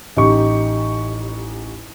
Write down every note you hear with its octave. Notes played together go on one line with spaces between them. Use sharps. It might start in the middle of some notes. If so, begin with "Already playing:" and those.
A1 D#4 G4 C#6